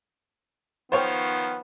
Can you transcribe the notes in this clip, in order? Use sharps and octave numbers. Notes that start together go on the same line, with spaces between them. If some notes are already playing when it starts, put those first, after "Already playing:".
D#3 F3 B3 C5 C#5 G5